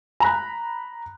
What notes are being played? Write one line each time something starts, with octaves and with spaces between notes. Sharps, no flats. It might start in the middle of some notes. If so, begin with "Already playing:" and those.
A#5 B5 F#6